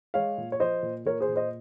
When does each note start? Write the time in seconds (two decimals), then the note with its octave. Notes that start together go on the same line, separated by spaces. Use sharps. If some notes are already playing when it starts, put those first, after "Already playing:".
0.14 G#3 C#5 F5
0.38 A#2
0.52 C#5
0.60 F3 C5 D#5
0.83 A#2
1.05 A#2 A#4 C#5
1.21 G#4 C5
1.28 A#2
1.36 C5 D#5